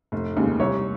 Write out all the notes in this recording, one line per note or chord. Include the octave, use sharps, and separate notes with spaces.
F1
D#2 C#3 G#3
C2 C#5